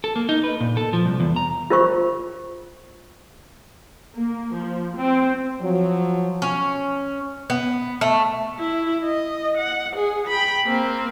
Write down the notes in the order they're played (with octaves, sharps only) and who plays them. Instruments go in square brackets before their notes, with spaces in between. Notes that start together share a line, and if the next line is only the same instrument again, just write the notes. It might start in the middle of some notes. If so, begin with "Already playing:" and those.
[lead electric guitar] A4
A#3
D#4
B4
A#2
A4
F3
C2
E2
A#5
[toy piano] F4 A#4 C5 C#6
[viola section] A#3
F3
C4
[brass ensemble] F3 F#3
[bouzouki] C#4
B3
A3
[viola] E4
D#5
F#5
G#4
G5 B5
A#3 C4